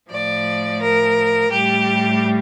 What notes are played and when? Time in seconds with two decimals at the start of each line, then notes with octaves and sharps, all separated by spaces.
0.11 A2 F3 D5
0.81 A#4
1.51 A2 G3 G4